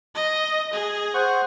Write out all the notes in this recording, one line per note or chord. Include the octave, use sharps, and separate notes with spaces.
D#5
G#4
C5 F#5 C#6